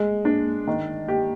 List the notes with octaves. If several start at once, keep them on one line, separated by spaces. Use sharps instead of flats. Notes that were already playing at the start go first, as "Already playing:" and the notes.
Already playing: G#3
D4
D#3
G4